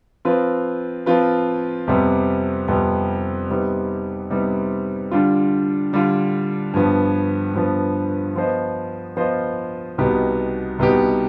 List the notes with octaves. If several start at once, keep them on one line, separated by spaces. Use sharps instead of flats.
F3 C4 F4 B4
F3 C4 F4 B4
F2 C3 G3 B3
F2 C3 G3 B3
C3 G3 B3 D#4
C3 G3 B3 D#4
D3 G3 D4 F4
D3 G3 D4 F4
G2 F3 B3
G2 F3 B3
F3 B3 F4 C5 D#5
F3 B3 F4 C5 D#5
C2 B2 B3 D#4 G4
C2 B2 B3 D#4 G4